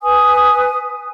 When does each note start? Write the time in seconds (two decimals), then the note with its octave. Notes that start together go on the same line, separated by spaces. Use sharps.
0.02 B4 G#5 D#6